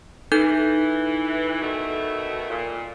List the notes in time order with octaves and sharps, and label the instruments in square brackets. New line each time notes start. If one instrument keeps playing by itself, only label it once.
[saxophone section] E3 [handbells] D#4 A4 G6
[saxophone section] B2 D#3 A3
A#2